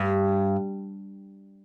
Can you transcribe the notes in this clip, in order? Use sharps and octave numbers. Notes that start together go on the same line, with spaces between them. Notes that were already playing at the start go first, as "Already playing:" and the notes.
Already playing: G2